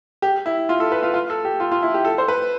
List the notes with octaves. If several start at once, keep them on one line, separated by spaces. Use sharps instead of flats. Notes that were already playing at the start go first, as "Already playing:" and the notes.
G4
E4
F4
A4
B4
F4
F4
A4
G4
F4
F4
E4
G4
A4
C5
B4